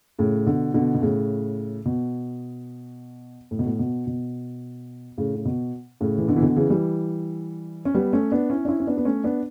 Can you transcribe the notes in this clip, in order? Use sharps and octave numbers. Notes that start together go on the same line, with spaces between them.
A2 C#3
B2 D3
B2 D3
B2
A2 C#3
B2
A2
B2
A2
B2
B2
A2 C#3
C#3
B2
A2 C#3
E3
B2 D3
E3
B2 D3
C#3 E3
E3 G3
C#4
G3 B3
A3 C#4
B3 D4
C#4 E4
D4
C#4 E4
C#4
B3 D4
B3
A3 C#4
B3 D4